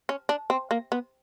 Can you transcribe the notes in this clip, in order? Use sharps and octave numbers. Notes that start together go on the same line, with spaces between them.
C#4
D4
C4
A#3
B3